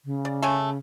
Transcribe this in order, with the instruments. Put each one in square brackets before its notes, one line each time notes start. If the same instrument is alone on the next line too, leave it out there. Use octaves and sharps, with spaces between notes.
[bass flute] C#3
[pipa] D5
A3 C#5 G#5